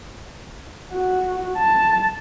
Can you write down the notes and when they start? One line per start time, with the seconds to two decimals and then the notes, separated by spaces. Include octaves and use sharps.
0.93 F#4
1.58 A5